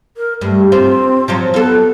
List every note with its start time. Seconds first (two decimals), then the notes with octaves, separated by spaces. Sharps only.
0.17 A#4
0.41 G2 A3
0.72 C4 F4 C5
1.28 F3 F#3 F4
1.54 B3 F4 A4